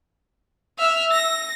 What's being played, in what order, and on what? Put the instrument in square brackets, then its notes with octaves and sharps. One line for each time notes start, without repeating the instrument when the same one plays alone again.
[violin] E5 F6 [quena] E6
[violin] A#6